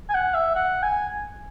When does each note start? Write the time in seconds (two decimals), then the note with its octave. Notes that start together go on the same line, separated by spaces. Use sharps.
0.09 G#5
0.14 F#5
0.34 E5
0.55 F#5
0.83 G#5